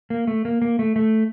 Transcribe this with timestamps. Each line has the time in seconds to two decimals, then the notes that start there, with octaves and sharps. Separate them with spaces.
0.10 A#3
0.27 A3
0.45 A#3
0.62 A#3
0.79 A3
0.96 A3